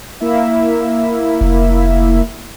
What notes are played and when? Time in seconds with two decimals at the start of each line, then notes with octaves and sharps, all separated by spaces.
0.20 A#3 E4 E5
1.41 F1